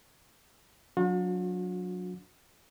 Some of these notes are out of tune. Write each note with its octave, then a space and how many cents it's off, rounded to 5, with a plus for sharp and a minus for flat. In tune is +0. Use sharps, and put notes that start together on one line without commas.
F#3 -15 D4 -20 F#4 -45